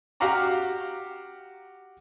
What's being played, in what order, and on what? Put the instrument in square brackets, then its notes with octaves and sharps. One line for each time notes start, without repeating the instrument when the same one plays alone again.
[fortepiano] F#4 G4 F5 F#5 A#5 D6